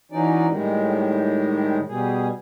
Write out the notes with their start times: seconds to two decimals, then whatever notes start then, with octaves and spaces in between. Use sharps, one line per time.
0.12 E3 F#3 C#4 D#4 D5
0.49 A2 D#3 G3 G#3
1.87 B2 G3 G#4